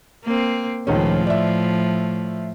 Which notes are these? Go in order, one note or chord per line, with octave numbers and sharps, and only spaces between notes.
A#3 C4
C#2 A2 D#3 F3 C#4
D5 E5